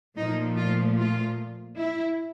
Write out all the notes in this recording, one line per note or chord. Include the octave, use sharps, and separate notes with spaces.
A#2 F3 A3 D#4
F4
F4
E4